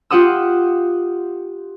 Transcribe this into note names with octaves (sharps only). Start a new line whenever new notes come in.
F4 G4 F#5 D#6 E6